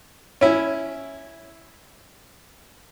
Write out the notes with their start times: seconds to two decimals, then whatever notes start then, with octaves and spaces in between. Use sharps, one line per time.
0.41 C#4 E4